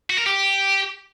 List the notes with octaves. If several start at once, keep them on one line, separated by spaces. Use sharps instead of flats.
F#4
A#4
G4